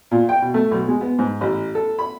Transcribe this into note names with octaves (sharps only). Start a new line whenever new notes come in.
A#2
G5
B2
A3
B1
G#3
B3
G#2
A1
A4
B5